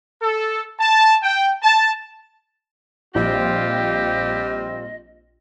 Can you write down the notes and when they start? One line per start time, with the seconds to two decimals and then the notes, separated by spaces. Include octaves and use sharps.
0.21 A4
0.80 A5
1.23 G5
1.63 A5
3.15 A#1 G3 C4 F4 G4 D#5